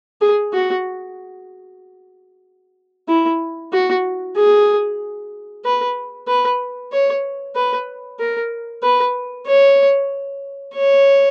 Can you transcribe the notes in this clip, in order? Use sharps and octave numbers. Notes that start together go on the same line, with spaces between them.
G#4
F#4
E4
F#4
G#4
B4
B4
C#5
B4
A#4
B4
C#5
C#5